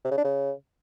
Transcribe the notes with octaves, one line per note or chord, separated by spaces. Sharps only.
C3
C#3
D4
C#3